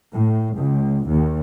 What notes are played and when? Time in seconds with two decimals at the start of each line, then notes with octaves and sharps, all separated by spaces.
0.13 A2
0.56 C#2
1.07 D#2